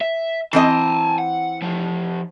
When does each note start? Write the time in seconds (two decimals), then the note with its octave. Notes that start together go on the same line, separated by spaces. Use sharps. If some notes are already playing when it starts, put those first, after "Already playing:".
0.01 E5
0.53 E3 C4 D#5 G#5 A5
1.18 F#5
1.62 F3 G4